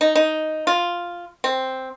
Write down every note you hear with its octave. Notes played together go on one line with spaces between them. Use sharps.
D#4
D#4
F4
C4